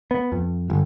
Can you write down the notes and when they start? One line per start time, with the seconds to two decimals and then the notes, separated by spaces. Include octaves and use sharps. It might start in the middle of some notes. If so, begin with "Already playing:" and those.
0.11 B3
0.32 F2
0.70 G1